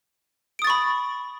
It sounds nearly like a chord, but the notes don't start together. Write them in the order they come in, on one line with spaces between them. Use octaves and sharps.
D7 D#6 A6 C#6 B5